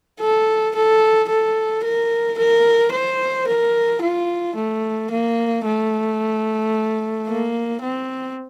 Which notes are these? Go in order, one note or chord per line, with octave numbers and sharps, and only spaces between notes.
A4
A4
A4
A#4
A#4
C5
A#4
F4
A3
A#3
A3
A#3
C4